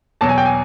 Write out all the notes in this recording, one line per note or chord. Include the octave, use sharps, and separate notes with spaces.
E2 B2 F#3 A5
G#5
G5
G#5